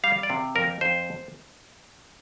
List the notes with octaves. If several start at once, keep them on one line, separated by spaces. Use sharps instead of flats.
G3 F5
D5
C3 F5
F2 A#4
F2 C5